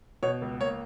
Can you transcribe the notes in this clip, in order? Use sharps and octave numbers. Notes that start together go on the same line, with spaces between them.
B2 C#5
C#2
A#3 C#5